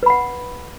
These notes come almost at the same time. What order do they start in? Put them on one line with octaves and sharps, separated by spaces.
B4 B5 F#5